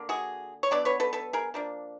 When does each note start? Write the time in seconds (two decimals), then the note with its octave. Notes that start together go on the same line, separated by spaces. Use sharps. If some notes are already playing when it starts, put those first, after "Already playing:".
Already playing: D3 A#3
0.09 F#4 G#4
0.63 C#5
0.71 F#3 B3 D4 D5
0.85 B4 C#5
1.00 A4 B4
1.13 A4 B4
1.33 G#4 A#4
1.54 F3 A#3 D4